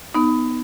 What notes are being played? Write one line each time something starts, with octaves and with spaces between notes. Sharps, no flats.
B3 D#4